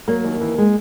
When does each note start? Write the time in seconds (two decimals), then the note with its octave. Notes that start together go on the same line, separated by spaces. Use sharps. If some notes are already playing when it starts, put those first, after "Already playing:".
0.08 F#3 A#3
0.24 D#2
0.41 E3
0.58 G#3